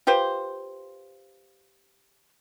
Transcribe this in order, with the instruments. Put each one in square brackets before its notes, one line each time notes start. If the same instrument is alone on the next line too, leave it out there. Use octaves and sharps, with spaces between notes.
[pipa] F4 G4 B4 C5